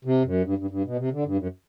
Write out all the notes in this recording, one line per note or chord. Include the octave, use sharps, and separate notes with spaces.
C3
F#2
G2
G2
G2
B2
C3
D3
G2
F#2